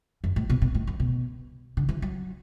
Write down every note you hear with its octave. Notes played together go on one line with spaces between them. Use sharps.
F#2
A2
B2
B2
A2
F#2
B2
D3
E3
F#3